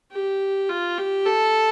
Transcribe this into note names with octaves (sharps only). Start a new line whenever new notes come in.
G4
F4
G4
A4